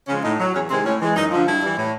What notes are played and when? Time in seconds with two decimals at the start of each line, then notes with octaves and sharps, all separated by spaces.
0.08 C#3 F3 G#3 C#4
0.23 A2 D#4
0.39 F#3
0.54 E2 C#4
0.69 C3 D#3 G#3 C4
0.84 A2 C#4
1.00 E3 G#3
1.15 F#2 D#4
1.31 D3 F3
1.45 G2 E4
1.62 E3 G3
1.77 A2